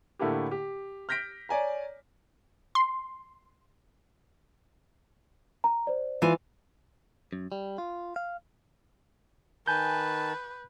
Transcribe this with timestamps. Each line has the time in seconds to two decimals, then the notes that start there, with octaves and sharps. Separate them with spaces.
0.19 A2 D3 A3 A#3 E4 G4
0.51 G4
1.09 F6 G6 A#6 B6 D7
1.49 C#5 D5 G#5 A#5
2.75 C6
5.64 A#5
5.87 C5 D5
6.22 E3 F4 G#5
7.33 F#2
7.52 G3
7.78 F4
8.16 F5
9.68 D#3 B4 G#5 A5 G6